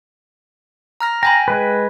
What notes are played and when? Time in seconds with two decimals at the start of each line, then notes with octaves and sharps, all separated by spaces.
1.00 A#5 F6 A#6
1.23 G5 G#5 A#5 B5
1.48 G#3 B4